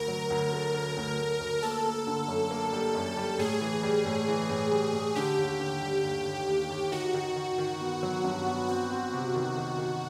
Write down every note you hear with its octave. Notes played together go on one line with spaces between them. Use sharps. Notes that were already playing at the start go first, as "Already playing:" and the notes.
Already playing: D2 A#4
F#3
D2
A3
D2
D2
A3
D2
A#3 A4
A#3
D3
F#2
A#3
G3
F#2
G3
A2 G#4
E3
G3
A2
E3
A2
G3
A2
D3 G4
D#2
D3
G3
D#2
D#2
D#2
D#2
D#3 F#4
D#3
D#3
D#3
B3
F#3
G2
B3
C4 F#4
C4
C3
D#3
D#3
D#3